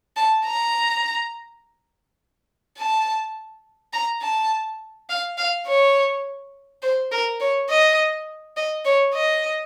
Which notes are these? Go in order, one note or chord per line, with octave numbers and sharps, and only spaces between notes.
A5
A#5
A5
A#5
A5
F5
F5
C#5
C5
A#4
C#5
D#5
D#5
C#5
D#5